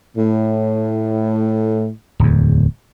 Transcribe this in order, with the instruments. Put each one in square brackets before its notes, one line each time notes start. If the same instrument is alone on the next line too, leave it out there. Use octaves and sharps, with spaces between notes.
[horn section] A2
[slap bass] D1 E2